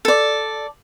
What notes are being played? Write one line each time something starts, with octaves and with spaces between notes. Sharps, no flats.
A4 D5